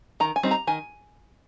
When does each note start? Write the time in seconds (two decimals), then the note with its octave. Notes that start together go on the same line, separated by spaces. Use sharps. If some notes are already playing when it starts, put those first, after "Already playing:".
0.20 D#3 A#5
0.36 G#5
0.43 G3 C4 D#4
0.51 A#5
0.67 D#3 G#5